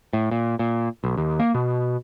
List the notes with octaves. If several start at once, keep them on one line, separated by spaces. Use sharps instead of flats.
A2
A#2
A#2
B1
D#2
A#3
B2